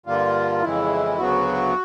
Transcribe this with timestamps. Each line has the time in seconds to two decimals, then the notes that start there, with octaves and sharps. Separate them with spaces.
0.06 G2 D3 G3 A#3 F4
0.62 F2 C#3 E3 G#3 E4
1.18 D2 C#3 F#3 B3 F#4